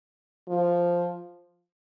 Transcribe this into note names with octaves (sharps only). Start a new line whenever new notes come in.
F3